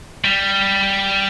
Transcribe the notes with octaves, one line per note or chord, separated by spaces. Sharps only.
G3